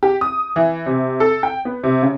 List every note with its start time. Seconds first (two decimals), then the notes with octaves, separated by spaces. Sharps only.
0.03 G4
0.21 D#6
0.56 E3
0.86 C3
1.20 A4
1.43 G5
1.65 B3
1.83 C3
2.03 C#3